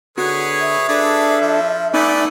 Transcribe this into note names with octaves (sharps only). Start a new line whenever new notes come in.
D3 F#4 G#4 B4 C#5
E5
D4 G#4 A4 B4 D5
F3
A3 B3 D4 D#4 D5 G#5 B5